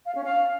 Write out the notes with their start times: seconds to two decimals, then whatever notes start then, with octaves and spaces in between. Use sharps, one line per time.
0.05 F5
0.14 C#4
0.24 F5